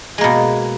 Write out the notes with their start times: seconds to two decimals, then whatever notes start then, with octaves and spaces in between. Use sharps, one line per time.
0.18 G#3
0.21 A#3
0.24 B2